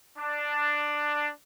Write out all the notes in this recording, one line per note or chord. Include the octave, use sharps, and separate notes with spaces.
D4